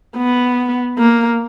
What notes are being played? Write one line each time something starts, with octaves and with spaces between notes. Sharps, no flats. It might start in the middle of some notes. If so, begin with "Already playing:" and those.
B3
A#3